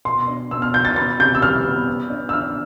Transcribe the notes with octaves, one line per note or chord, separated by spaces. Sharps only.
B2 C6
D4
B2 E6
F6
B2 G6
A6
B3 A6
C3 G6
E6
G3 F6
B3
B3
D4
E6
D4 F6